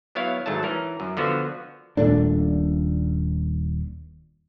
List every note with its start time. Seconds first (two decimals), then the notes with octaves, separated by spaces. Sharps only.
0.15 F#3 B3 E4 C#5 F5
0.46 G#1 G#2 F#3 A3 A5
0.63 E3 C#4 A#4
1.00 F#2
1.17 D3 F3 B3 F#4
1.97 D#1 A#2 A3 D4